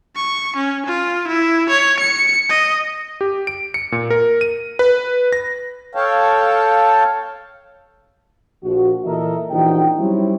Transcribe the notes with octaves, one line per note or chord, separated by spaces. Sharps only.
C#6
C#4
F4
E4
C#5
C#7
D#5
G4
D7
C#7
A#2
A#4
D#7
B4
A#6
A4 C#5 F5 G5 A5
A#1 F3 F#4
A#2 E3 A4 A#4 D#5 E5
A#1 E3 F3 D#4 F#4 G5
F#3 G3 C4 C#4 D#4 E4